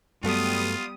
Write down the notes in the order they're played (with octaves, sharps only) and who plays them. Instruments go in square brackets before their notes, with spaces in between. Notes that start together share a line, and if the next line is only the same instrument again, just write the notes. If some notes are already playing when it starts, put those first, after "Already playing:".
[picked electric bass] G2 F#3 A3 [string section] G3 B3 D#6 [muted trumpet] F4